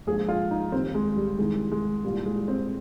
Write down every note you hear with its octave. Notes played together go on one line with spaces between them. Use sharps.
A#1 G#2 F3 G#4
F4
D#4
D#2 D#3 G3 C4
G#3
G3
C2 C3 D#3 G#3
G#3
C2 A#2 G3
G#3
C4